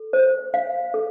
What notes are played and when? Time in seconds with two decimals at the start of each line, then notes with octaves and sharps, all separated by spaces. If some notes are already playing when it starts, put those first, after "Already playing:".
Already playing: A4
0.13 C5
0.54 F5
0.94 A4